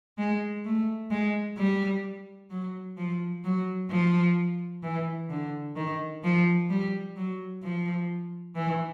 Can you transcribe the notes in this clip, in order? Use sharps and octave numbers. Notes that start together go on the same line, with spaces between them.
G#3
A3
G#3
G3
F#3
F3
F#3
F3
E3
D3
D#3
F3
G3
F#3
F3
E3